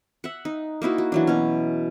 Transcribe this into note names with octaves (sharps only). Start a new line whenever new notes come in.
E5 F#5
D#4
A#3 D#4 E4 F#4
F#4
E3 F#3 D4
B2 C#4